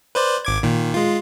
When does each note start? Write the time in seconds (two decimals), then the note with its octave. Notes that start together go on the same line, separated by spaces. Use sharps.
0.15 B4 C5 D5
0.45 G#1 D6 G#6
0.63 A#2 D#3
0.94 G#3 F4